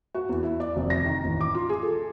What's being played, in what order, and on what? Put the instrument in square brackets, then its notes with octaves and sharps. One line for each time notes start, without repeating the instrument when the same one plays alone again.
[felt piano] F#4
E2
E4
D5
F1
A#6
D#3
A1
D6
F4
G#4
A4